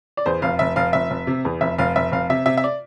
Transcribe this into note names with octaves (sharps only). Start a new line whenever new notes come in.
D5
E2 C5
F1 F5
F1 E5
F1 F5
F1 E5
F1
C3
E2
F1 E5
F1 F5
F1 E5
F1 F5
C3 E5
C3 E5
E5
D5